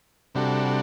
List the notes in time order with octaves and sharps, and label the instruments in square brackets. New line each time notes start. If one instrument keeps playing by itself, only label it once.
[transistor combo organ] C3 G3 D4 F#4 A4